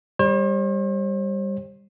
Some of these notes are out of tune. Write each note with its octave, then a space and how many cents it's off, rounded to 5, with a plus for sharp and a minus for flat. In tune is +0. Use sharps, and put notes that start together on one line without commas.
G3 +15 C5 +45